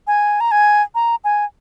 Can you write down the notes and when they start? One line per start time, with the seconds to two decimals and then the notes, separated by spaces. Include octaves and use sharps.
0.07 G#5
0.40 A#5
0.51 G#5
0.95 A#5
1.24 G#5